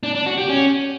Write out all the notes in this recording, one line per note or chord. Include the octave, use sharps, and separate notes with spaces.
D4
D4
F#4
G4
C#4